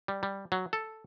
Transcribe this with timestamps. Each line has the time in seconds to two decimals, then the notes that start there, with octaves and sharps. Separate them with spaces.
0.08 G3
0.23 G3
0.52 F#3
0.73 A4